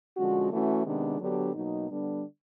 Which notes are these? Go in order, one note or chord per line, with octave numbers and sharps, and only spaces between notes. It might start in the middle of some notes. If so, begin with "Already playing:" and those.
D3 F3 G#3 C#4 F#4
E3 A3 C#4 F#4
C3 D#3 G#3 B3 D4
D3 F#3 B3 D4 G4
B2 F#3 A#3 D#4
D3 G3 B3 D4